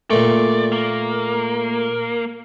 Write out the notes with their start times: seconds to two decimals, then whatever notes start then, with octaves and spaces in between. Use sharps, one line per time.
0.10 A#2 A3 D5
0.72 A#3